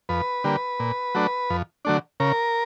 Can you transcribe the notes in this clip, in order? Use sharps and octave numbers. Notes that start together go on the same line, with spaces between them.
F2 B4
D3 G3 A#3
A#2
F#3 A3 D4
F2
D3 F#3 A3 D4
C#3 A#4